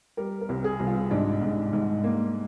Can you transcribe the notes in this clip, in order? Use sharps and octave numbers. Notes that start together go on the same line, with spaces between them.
G3 A#4
A#4
C2
G#4
C2
F4
G#2 D4
G#2
G#2
A#3